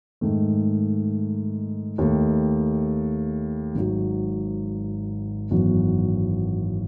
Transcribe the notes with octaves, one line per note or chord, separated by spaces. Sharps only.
G#2 D#3 A3
D#2 D#3 A3
G#1 G#2 F#3
G#1 F#2 E3 B3 F#4